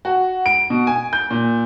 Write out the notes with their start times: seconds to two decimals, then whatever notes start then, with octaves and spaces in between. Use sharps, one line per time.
0.05 F#4
0.46 D7
0.70 B2
0.87 G#5
1.13 G6
1.31 A#2